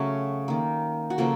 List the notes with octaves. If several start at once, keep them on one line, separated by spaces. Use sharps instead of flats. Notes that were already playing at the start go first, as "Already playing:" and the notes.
Already playing: C#3 F#3 A3 C#4
D#3 A#3
F#4
C#3 F3 A#3 A4